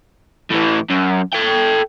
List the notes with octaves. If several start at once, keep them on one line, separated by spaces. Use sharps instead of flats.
A2 E3
F#2
A4 G5